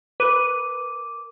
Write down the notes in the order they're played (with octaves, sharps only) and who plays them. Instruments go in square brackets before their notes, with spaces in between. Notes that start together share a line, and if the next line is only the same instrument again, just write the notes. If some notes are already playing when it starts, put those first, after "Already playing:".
[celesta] A#4 D6 [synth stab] B4 D#7